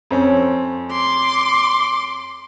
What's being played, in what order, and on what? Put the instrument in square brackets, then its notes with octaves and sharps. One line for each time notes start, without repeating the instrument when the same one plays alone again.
[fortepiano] F2 C4 C#4
[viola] C6 D6